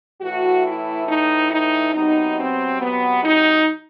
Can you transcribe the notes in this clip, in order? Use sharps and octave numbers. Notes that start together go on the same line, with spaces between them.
A2 E3 A3 F#4
E4
D#4
D#4
C3 F#3 B3 D#4
C4
B3
D#4